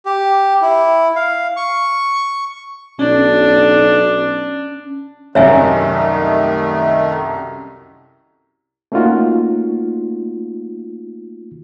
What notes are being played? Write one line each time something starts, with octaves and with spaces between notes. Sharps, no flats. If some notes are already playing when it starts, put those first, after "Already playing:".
G4
E4
F5
C#6
B1 C#4 D4
C2 F#2 D#3 A3 C#5 E5 G#5
A3 A#3 C#4 D#4 F4 F#4